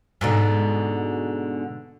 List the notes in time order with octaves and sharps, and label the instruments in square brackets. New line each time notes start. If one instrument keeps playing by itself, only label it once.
[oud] G#2 B2 D3